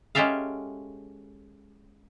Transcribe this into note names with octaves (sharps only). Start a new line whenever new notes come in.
G#3 C#4 G4 A4 E5 F5